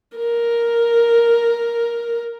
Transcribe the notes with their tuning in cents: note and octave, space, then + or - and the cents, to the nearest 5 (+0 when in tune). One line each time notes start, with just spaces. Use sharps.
A#4 +5